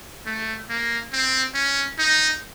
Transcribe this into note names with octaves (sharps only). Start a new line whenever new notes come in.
A3
A#3
C4
C#4
D#4